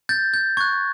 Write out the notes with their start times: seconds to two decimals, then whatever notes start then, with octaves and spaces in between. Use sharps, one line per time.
0.09 G6 A6
0.34 G6
0.57 C#6 F#6 G#6